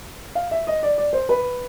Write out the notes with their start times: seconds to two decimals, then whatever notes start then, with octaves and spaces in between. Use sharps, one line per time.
0.35 F5
0.51 E5
0.67 D#5
0.83 D5
0.98 D5
1.13 C5
1.29 B4